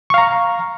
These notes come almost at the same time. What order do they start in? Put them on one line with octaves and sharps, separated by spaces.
C#6 F5 A#5